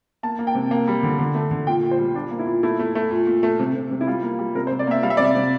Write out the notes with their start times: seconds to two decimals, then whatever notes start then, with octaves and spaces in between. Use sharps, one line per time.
0.23 A#3 A5
0.39 A#3
0.47 G5
0.55 C3
0.71 A#3
0.88 G3
1.03 D3
1.19 D3
1.35 A3
1.51 D3
1.67 A#2 G5
1.83 A#2
1.91 C5
1.99 G3
2.15 A#2 D4
2.31 A#3
2.39 E4
2.47 A#2
2.63 A3 E4
2.79 A3
2.95 A3
3.11 A#2
3.27 A#2
3.43 A3
3.59 C3
3.75 C3
3.91 C3
4.01 E4
4.07 G3 F4
4.23 A#3
4.39 G3
4.55 C3 A#4
4.67 C5
4.71 C3
4.79 D5
4.87 A#3 E5
5.03 G3 F5
5.10 E5
5.17 C3 D5
5.24 E5
5.35 C3